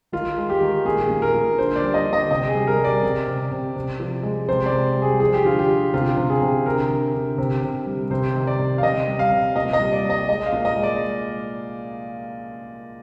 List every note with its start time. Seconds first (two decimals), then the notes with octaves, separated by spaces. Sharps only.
0.12 D#3 F4
0.38 G#3
0.50 G4
0.61 D#3
0.85 A#2 G#4
1.09 A#2
1.22 A#4
1.34 A#2
1.58 D3 C5
1.76 D5
1.82 G3
1.94 D#5
2.06 D3
2.13 D#5
2.31 C3 D#5
2.49 G#4
2.55 G3
2.67 A#4
2.79 G3
2.84 D5
3.02 C3
3.28 C3
3.51 C3
3.76 C3
4.00 F3
4.23 G#3
4.48 C3 C5
4.66 D5
4.72 C3
4.96 G3
5.02 G#4
5.20 F3 G#4
5.34 G4
5.45 D3 F4
5.59 G4
5.69 D3
5.94 C3 F4
6.17 C3
6.30 G#4
6.41 C3
6.66 D3 A#4
6.90 D3
7.14 D3
7.38 C3
7.63 C3
7.86 G3
8.10 C3 C5
8.35 D#3
8.47 D5
8.59 C3
8.78 F5
8.83 C3 D#5
9.07 G3
9.19 F5
9.31 C3
9.55 A#2 D#5
9.73 D#5
9.79 G3
9.93 D5
10.04 G3
10.10 D#5
10.28 G#3 D#5
10.46 F5
10.53 A#2
10.65 D#5
10.77 G#3
10.83 D5